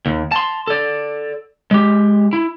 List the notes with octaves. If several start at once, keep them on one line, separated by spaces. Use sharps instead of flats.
D#2
A5 C6
A4 D5
G#3 G4
E4